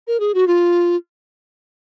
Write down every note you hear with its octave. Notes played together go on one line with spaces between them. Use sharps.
A#4
G#4
F#4
F4